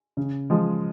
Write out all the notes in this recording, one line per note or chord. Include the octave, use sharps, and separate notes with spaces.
C#3
F3 G#3